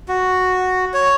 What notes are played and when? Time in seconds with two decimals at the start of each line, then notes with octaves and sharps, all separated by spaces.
0.08 F#4
0.94 C#5